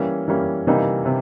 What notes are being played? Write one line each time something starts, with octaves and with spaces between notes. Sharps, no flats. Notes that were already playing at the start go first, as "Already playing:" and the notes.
Already playing: E3 G3 A#3 C#4
E3 G3 A#3 C#4
C3 E3 G3 A#3 D#4
C3